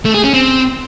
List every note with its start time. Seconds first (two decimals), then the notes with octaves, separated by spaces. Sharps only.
0.05 A3
0.14 G#4
0.24 C#4
0.33 C4